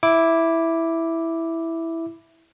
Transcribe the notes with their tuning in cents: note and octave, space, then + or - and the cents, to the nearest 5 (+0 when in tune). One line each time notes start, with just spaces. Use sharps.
E4 +0 D6 +0